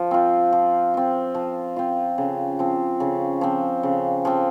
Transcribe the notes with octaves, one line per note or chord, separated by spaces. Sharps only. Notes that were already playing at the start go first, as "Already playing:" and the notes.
Already playing: F3
C4 F4
F3
C4 F4
F3
C4 F4
C#3
F3 C4
C#3
F3 C4
C#3
F3 C4